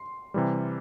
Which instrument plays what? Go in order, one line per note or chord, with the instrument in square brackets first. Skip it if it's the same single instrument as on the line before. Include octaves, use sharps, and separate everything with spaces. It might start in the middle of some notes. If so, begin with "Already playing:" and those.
Already playing: [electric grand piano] C6
C3 E3 G3